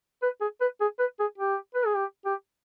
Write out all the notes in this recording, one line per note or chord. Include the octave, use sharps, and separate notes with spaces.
B4
G#4
B4
G#4
B4
G#4
G4
B4
G#4
G4
G4